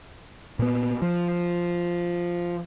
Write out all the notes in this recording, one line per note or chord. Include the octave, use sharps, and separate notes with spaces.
A#2 B3
F3